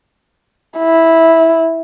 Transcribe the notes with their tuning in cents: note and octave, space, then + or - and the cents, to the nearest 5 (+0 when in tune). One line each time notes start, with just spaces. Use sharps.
E4 -10